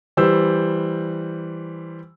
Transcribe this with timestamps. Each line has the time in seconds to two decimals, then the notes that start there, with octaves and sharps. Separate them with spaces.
0.17 E3 G3 C5 E6